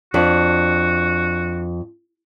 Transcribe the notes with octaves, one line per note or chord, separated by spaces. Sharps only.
F2 D4 F#4